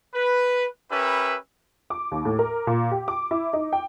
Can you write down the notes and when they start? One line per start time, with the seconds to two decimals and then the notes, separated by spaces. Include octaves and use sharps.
0.14 B4
0.91 C#4 G4 A#4 B4 E5 B5
1.90 D6
2.11 D#2
2.25 A2
2.39 A#4
2.67 A#2
2.91 G4
3.08 D6
3.31 E4
3.53 D#4
3.73 G5